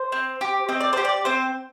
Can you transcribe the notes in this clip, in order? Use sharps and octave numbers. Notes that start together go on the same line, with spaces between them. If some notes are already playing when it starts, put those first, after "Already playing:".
Already playing: C5
C4
G4
C4 D#5
D5
G4 C5
D5
C4 C5